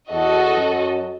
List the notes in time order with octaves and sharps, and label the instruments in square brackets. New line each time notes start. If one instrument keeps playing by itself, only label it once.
[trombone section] E2 [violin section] F#4 A4 D#5
[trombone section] F#2